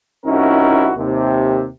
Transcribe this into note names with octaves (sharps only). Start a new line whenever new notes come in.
C2 C#4 D#4 E4 F#4 A#4
D#2 C3